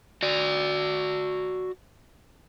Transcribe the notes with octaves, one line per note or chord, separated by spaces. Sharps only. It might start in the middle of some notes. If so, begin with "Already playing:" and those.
F#4 D5